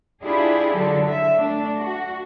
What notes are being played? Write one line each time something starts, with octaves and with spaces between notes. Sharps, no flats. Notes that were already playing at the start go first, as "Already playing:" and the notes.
D4 E4 F4 G4 G#4
D3 F#3 A4
E5
A3 D4
F#4